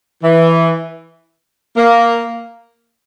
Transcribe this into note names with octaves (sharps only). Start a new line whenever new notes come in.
E3
A#3